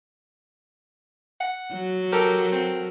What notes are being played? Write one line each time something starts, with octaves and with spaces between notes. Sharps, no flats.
F#5
F#3
G4 A4 A#4
C4